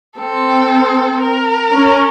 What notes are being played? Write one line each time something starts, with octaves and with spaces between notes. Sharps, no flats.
C4 A4
A#4
C#4